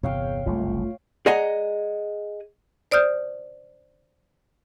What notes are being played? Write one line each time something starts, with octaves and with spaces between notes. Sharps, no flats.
G1 E2 C3 C#5 F5 G5
F#1 C2 A3 F4
G#4 D5 D#5 F#5 G#5 A#5
C5 D5 D#6 F6 G6